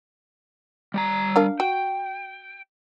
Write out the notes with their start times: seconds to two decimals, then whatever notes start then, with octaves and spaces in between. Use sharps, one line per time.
0.94 G3 D5 A#5
1.36 D4 A#4 F5
1.60 F#4 G5